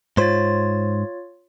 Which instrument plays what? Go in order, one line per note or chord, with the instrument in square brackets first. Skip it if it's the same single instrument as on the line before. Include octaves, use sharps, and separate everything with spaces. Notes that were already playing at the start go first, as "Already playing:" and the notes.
[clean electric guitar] G#2 C5 [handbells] F4 C#5 A6